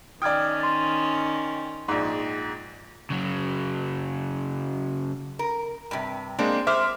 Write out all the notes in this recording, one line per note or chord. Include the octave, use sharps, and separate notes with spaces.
D#3 C#4 D5 G5 D#6 F6 G#6
C6 A6
A#1 G#2
C#3 F#3
A#4
G2 C3
G#3 A#3 C4 D4
C5 E5 D6 F6